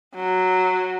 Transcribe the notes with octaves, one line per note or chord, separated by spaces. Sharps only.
F#3